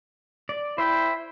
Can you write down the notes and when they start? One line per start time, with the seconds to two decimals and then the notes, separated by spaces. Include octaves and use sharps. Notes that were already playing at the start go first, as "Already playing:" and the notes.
0.49 D5
0.78 E4 C5 E5 G5